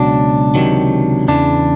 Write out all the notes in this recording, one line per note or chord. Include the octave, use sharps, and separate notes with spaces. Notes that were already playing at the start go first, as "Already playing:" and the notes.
Already playing: C#2 B2 F#3 D4
C#2 C3 D#3 F#3
E2 C#3 E3 D4